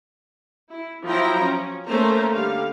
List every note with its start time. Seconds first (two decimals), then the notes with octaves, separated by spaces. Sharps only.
0.70 E4
1.04 F3 F#3 E4 C5 G5 A#5
1.44 C#4
1.86 A3 A#3 C#4 C5 A#5
2.33 D3 G3 F5